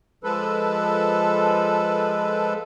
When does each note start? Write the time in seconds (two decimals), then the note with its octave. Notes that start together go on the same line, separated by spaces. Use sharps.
0.24 F3 G#3 A4 B4